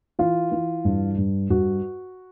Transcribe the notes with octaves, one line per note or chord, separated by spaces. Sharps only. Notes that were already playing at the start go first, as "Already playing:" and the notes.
E3 F4
E3
G2
G2
G2 F#4